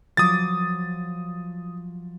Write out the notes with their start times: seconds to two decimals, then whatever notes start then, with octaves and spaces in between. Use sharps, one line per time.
0.17 F3 F#3 D6 D#6 A6